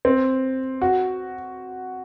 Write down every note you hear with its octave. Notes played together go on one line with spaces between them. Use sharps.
C4
F#4